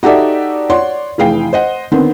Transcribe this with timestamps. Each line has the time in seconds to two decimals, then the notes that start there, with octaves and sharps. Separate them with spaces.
0.03 D#4 F#4 G4 A4 D5 E5
0.70 C#5 D5 F#5 C6
1.18 F1 E3 G#4 F5 G5 C7
1.53 C5 D#5 F#5
1.91 D3 D#3 B3 C4